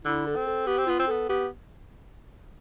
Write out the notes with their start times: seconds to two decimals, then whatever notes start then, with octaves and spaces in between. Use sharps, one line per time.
0.05 D3 E4
0.27 A4
0.36 C4
0.47 A4
0.67 B3 G4
0.78 C4
0.87 B3 F4
0.99 C4
1.08 B3 A4
1.29 B3 G4